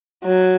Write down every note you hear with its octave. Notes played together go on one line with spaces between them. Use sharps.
F#3